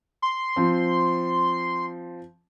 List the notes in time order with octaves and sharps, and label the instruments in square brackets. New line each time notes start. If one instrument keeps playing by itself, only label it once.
[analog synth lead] C6
[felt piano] F3 C4